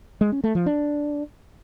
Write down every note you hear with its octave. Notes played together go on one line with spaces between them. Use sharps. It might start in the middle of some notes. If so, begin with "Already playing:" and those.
G#3
C#4
A3
F3
D4